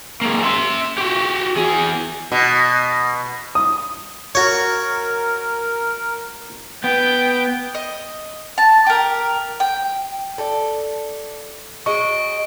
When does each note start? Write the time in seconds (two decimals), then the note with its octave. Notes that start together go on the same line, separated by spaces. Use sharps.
0.21 G#3 A#3
0.43 E5 C6
0.98 F#4 G4
1.56 E2 G#4
2.32 B2
3.55 D#6
4.35 F#4 A#4 C#5
6.84 B3 G5
7.75 D#5
8.58 A5
8.86 G4 A#4
9.60 G5
10.38 A4 D5
11.86 F#3 G#3 D#5 C#6 D7